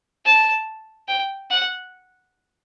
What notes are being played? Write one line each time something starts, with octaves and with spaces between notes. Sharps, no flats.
A5
G5
F#5